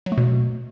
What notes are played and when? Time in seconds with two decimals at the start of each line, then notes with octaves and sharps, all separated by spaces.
0.06 F#3
0.12 A3
0.17 B2